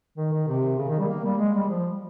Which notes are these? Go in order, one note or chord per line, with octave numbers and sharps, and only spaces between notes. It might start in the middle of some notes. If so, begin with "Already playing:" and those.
D#3
D#3
C3
C#3
D#3
G3
A#3
G3
G#3
G3
F3